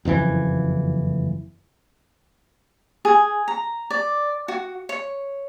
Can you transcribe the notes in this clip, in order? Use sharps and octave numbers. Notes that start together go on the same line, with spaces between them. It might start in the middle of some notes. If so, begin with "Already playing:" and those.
F#1 F2 A2 E3
G#4
A#5
D5
F#4
C#5